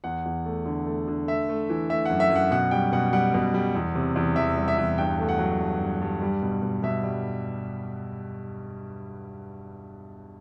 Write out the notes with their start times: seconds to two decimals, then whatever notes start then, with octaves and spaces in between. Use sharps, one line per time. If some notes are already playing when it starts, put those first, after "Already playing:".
0.04 E2 F#5
0.25 E2
0.45 A3
0.66 D3
0.86 A3
1.08 D3
1.27 A3 E5
1.49 A3
1.69 E3
1.89 A3 E5
2.05 F#2 F#5
2.20 E5
2.30 F#2
2.35 F#5
2.51 B2 F#5
2.71 G3 G5
2.92 B2 F#5
3.13 G3 F#5
3.34 B2
3.54 G3
3.75 E2
3.95 C3
4.16 E2
4.36 E2 E5
4.57 G3
4.68 E5
4.78 E2
4.98 G2 G5
5.19 A3
5.29 F#5
5.39 F#3
5.59 G2
5.80 G2
6.01 G2
6.22 G3
6.42 B2
6.62 B2
6.83 B2 E5
7.03 G3